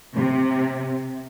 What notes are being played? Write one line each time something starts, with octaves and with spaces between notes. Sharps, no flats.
C3